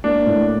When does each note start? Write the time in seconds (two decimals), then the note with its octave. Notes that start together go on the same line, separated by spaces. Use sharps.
0.04 A#3 D4
0.26 A2